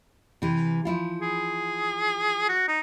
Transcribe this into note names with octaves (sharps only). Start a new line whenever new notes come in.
C3 E3
F3 E4 F4
G#4
F#4
D#4